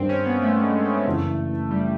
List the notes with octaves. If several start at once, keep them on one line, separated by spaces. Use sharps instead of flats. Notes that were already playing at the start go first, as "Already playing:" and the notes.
Already playing: G2 D#3 G3 C4
C#4
B3
A3
G#3
A3
F#1 F#2 C#3 E3
G3